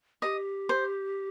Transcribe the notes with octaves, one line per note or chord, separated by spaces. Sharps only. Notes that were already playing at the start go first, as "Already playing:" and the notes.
G4 D#5
C5